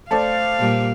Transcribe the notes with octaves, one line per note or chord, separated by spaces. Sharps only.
A3 A4 C5 D5 F5 A5
A#2 G3